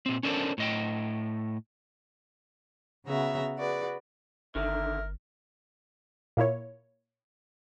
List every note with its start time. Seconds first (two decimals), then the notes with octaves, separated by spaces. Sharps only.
0.06 A#2 C4
0.23 C#4 D4 A4 A#4 C5
0.58 A2 D#5 G5
3.06 C#3 B3 F#4 G#4 E5 A#5
3.56 F#4 G#4 B4 D5
4.55 G1 D3 D#3 A#4 E5
6.37 A#2 A#3 E4 C#5